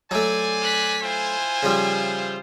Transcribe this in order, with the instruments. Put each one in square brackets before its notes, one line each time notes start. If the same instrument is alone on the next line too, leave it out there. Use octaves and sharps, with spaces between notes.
[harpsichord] F#3 A3 [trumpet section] C5 D5 G#5
[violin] F#6 B6
[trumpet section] E4 F4 C5 [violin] G#5
[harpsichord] C#3 F3 G3